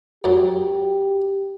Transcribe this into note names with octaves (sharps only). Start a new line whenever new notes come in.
F#2 F#3 G4